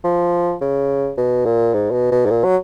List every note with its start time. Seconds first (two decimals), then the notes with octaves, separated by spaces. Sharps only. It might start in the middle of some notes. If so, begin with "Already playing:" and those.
0.04 F3
0.61 C#3
1.17 B2
1.46 A#2
1.74 G#2
1.92 B2
2.11 B2
2.26 G#2
2.30 A#2
2.44 F#3